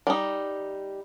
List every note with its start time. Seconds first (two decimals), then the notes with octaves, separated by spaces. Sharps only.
0.07 G3 D#4